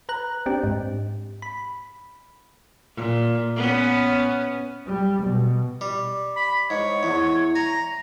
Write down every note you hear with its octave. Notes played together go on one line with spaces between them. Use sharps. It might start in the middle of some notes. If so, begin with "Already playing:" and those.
B4 A#5 F#6
C4 D4 G4
G#2
B5
A#2
B3 C#4
G3
B2
G3
B5
G#2 C#5
E2
G#5 A#5